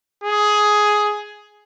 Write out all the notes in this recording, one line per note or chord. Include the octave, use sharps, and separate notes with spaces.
G#4